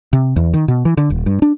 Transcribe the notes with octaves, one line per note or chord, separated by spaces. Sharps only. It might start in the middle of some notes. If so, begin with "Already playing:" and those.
C3
E2
D#3
B2
E3
D3
D#1
G2
D4